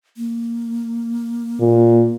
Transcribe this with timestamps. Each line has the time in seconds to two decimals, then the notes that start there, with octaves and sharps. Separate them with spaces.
0.17 A#3
1.60 A#2